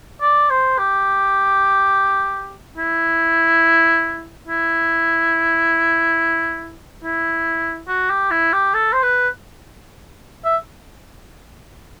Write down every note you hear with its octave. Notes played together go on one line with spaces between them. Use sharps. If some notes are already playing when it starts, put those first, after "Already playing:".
D5
C5
G4
E4
E4
E4
F#4
G4
E4
G4
A4
C5
B4
E5